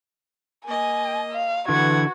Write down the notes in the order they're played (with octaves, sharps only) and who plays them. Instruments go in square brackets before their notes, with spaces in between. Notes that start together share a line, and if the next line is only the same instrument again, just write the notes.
[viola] A#3 D#5 [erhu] G#5
[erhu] F5
[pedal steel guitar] D3 E3 [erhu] F#4 [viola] B4 F#5 [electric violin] G#6